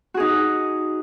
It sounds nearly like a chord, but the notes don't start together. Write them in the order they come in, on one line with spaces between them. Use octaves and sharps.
F#4 G#4 D#4